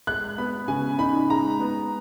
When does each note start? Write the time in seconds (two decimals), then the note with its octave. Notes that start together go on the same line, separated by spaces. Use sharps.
0.07 G#3 F#6
0.38 B3 B5
0.68 C#3 G#5
0.99 D#4 B5
1.29 G#3 A#5
1.60 B3